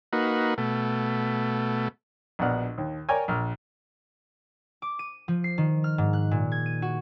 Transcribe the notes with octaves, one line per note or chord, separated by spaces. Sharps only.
A#3 D#4 F#4 B4
B2 A3
A#1 B2 D4 F#5 F6
D#2
A#4 C#5 D5 G5 G#5
A#1 F6
D6
D#7
F3
C7
D#3
F6
G#2
F#6
A#2
G#6
D#7
F#4